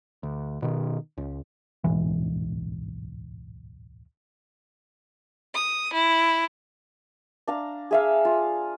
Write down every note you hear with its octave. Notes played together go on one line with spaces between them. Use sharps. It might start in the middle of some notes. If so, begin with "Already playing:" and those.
D2
B2 D#3
C#2
D1 B1 G#2 E3
D#6
E4
D4 F5 A#5
G#4 E5 F5
F4